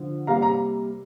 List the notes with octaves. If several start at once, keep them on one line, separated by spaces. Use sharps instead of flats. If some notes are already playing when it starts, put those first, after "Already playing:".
Already playing: D3 F3
C3 G3 A#3 F5 A#5
A#5